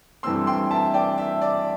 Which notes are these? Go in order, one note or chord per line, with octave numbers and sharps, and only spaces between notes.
G2 E3 A3 C4 C6 E6
G5 C6
E5 A5
D5 G5
E5
D5